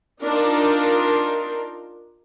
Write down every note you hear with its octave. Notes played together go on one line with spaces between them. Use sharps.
D4 D#4 F4 A#4